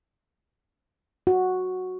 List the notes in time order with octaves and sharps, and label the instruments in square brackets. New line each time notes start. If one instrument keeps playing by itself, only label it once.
[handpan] F#4